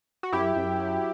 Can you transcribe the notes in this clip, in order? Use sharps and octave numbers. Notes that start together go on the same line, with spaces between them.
F#4
F#2 E4 G4
F#2
F#3